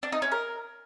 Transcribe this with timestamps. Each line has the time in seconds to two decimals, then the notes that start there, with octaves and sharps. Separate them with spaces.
0.03 D4
0.12 D#4
0.22 C#4
0.32 A#4